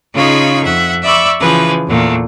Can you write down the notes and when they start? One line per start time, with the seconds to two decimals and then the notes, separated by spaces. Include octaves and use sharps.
0.14 C#3 D#4 F4 G#4 B5 C#6
0.64 F2 E5 F#5
1.03 D5 E5 B5 C#6 D6 E6
1.40 C#3 E3 F3 G#4 B4
1.87 E2 A#2 A3